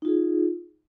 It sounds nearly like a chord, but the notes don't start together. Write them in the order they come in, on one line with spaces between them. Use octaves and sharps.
D#4 F4 G#4